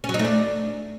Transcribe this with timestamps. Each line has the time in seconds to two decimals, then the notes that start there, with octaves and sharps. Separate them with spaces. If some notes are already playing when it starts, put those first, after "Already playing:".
0.04 C#4
0.09 F#3
0.14 D#4
0.19 A3
0.25 D4